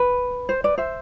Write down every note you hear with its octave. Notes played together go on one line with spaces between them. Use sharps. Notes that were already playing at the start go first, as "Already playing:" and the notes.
Already playing: B4
C5
B4 D5
C5 E5